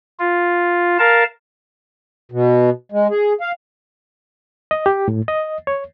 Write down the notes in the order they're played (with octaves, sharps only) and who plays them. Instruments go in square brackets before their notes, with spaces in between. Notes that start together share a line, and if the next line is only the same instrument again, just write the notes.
[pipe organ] F4
A#4 F5 A5
[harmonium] B2
G#3
G#4
F5
[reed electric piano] D#5
G4
A2
D#5
C#5